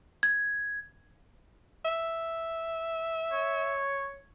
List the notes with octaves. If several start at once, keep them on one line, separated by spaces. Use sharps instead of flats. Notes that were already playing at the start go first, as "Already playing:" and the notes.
G#6
E5
C#5